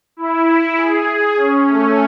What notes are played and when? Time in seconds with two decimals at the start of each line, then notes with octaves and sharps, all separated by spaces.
0.17 E4
0.77 G#4
1.07 G#4
1.37 C#4
1.67 A3